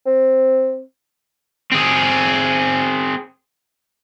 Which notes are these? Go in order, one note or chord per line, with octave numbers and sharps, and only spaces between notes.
C4
C4 G#4